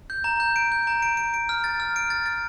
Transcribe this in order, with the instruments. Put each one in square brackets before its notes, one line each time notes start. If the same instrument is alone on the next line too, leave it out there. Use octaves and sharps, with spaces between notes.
[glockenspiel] G6
A#5
G6
D7
G6
A#5
D7
D7
D7
F6
A6
F6
D7
A6
A6